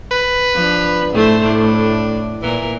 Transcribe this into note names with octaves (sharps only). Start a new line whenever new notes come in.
B4
F3 D4
A2 A3 C5
A2 D4
A#2 E3 A#4